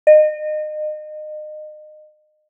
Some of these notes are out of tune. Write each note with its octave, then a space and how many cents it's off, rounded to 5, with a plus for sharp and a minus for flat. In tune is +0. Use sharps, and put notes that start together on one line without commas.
D#5 -30